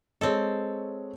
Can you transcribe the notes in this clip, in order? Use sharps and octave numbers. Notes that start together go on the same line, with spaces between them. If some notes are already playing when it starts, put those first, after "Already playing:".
G#3 C4 A4 C#5 D#5